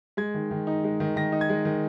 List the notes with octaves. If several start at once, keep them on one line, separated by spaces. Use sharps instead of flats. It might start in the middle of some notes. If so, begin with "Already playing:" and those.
G#3 G#6
D#3
D#3
D#4
G#3
D#3
D#3 A#6
D#4
G#6
G#3
D#3